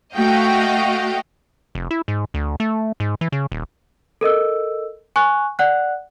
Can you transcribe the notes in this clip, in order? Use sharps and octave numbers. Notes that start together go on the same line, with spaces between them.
A3 F#4 D#5 F5 G5
F1
E4
G#2
D2
A3
G#2
E3
C#3
D#1
A4 A#4 D#5 E6
G#5 C#6 F#6
D5 F#5 F#6